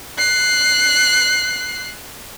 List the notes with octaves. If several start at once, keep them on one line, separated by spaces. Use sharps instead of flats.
F#6 C7